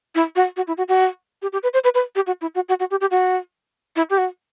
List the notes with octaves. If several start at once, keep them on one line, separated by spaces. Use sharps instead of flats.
E4
F#4
F#4
E4
F#4
F#4
G4
G4
B4
C5
B4
B4
G4
F#4
E4
F#4
F#4
F#4
G4
G4
F#4
E4
G4
F#4